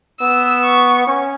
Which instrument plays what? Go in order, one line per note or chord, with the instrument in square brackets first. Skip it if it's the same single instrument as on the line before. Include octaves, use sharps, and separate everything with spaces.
[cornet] B3 [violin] E6
[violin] C#6
[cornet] C#4